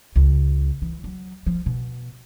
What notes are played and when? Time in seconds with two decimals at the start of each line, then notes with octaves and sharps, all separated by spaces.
0.16 C#2
0.82 E3
1.04 F#3
1.46 F3
1.66 B2